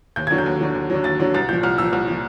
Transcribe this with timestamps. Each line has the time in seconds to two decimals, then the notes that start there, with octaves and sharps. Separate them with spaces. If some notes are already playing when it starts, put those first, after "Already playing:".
0.16 D#2 G6
0.27 D3 F#3 G#6
0.38 G6
0.46 D#2
0.61 D3 F#3
0.75 D#2
0.90 D3 F#3
1.04 D#2 A6
1.20 D3 F#3
1.34 C2 A6
1.49 A#2 F3 G6
1.63 C2 F6
1.78 A#2 F3 E6
1.93 C2
2.08 A#2 F3